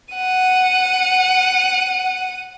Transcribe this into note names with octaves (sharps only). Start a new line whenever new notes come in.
F#5 D#7